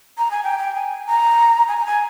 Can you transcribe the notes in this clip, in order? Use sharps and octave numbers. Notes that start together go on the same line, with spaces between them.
A#5
G#5
G5
G5
G#5
A#5
G#5
A#5
G#5